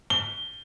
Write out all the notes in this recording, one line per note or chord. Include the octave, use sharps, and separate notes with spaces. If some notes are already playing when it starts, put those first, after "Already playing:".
G7